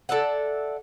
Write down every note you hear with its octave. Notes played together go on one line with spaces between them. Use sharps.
A4 D5 E5 F#5